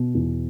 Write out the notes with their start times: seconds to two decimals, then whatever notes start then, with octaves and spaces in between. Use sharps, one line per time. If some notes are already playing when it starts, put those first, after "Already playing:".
Already playing: B2
0.15 E2